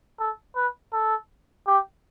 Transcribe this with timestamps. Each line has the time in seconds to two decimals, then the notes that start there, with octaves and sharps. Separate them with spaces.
0.20 A4
0.56 B4
0.93 A4
1.67 G4